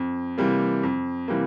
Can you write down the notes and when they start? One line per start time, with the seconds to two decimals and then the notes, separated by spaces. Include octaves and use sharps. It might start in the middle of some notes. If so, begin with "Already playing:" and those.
Already playing: F2
0.38 C3 E3 G3 A#3
0.83 F2
1.28 C3 E3 G3 A#3